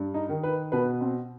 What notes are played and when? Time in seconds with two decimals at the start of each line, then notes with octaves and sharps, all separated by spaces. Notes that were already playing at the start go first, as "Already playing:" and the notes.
Already playing: G2
0.14 D#4
0.29 D#3
0.43 B4
0.72 B2 B4
1.01 C4